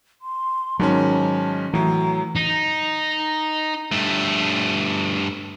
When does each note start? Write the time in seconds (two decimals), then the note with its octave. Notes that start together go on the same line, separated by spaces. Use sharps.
0.22 C6
0.80 G#2 D#3 F#3 C#4 A5
1.73 A2 E3 F#3 A#5
2.35 D#4
3.92 G2 A3